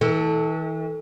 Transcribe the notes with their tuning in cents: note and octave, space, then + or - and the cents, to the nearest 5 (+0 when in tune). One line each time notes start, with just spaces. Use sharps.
E3 -40 A4 +0